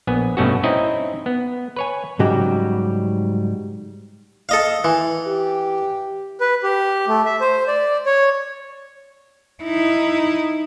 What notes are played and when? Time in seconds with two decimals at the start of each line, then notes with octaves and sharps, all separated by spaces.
0.07 A#1 B3 G#5
0.37 G2 B2 A3 C#4 F#4
0.63 C4 C#4 D#4 E4 D#5
1.26 B3
1.76 B4 C#5 G#5
2.19 G#2 C#3 F#3 G3 F#4 G4
4.49 A4 D#5 F5
4.84 E3
5.27 G4
6.41 B4
6.63 G4
7.08 A3
7.26 E5
7.41 C5
7.68 D5
8.06 C#5
9.63 D#4 E4